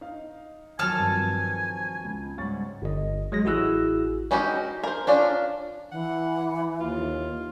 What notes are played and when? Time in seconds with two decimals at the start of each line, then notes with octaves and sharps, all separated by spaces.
0.01 D#4 F5
0.79 D#3 F3 F#3 A4 G#5 A5 F6
0.98 G2 F3 C4
2.04 C#2
2.38 G#2 C#3 G3 F#5 C#6 A6
2.82 G1 D#5
3.32 F#3 G#3 A#6
3.44 A1 E4 F#4 G#4 E6 F#6
4.31 G#3 C#4 D#4 F#4 G4
4.84 A#4 C5
5.07 C#4 D4 F4 D5
5.92 E3 F#5
6.80 D#2 F4